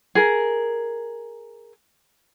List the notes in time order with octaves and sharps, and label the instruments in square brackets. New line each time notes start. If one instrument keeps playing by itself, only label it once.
[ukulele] G#4 A#4